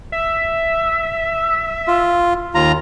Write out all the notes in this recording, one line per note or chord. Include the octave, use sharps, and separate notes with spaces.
E5
F4
D#2 F4 A#5